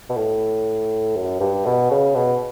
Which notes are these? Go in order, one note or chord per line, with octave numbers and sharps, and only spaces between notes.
B2
A2
F#2
G2
B2
C#3
B2